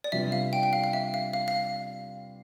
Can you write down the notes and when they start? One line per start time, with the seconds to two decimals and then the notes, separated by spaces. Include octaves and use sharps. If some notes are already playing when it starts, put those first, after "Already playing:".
0.04 D5
0.12 C3 G3 B3 D4 F4 E5
0.32 F5
0.53 G5
0.63 G5
0.73 F5
0.84 F5
0.93 E5
1.14 F5
1.33 F5
1.48 F5